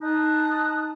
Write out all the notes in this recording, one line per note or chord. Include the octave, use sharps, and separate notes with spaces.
D#4 A5 D#6 F#6